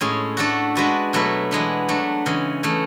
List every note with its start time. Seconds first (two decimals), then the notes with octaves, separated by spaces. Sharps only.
0.01 A2 G#3 C#4 G#4
0.37 A3 D4 F#4 A4 D5
0.75 G#3 D4 F#4 B4 D5
1.13 B2 F#3 A3 E4 B4
1.51 E3 G#3 B3 D4
1.89 F#3 A3 D4
2.26 C#3 E3 G#3
2.63 C#3 E3 A3